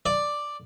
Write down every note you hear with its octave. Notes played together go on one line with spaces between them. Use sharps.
D5